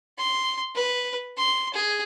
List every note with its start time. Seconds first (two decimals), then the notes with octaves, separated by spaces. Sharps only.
0.18 C6
0.75 B4
1.37 C6
1.74 G#4